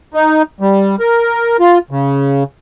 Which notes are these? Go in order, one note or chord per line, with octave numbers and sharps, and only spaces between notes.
D#4
G3
A#4
F4
C#3